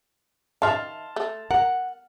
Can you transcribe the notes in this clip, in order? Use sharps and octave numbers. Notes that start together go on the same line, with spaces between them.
D#3 E5 F5 A5 C6 F6
A3
A#4 F#5